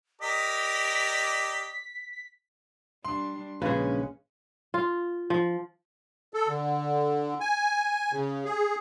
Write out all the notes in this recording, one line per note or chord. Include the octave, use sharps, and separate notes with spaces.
G4 A#4 D5 D#5 B6
G3 D4 C6
A#1 C#3 G#3 C#4 G#4 B4
F4
F3
A4
D3
G#5
C#3
G#4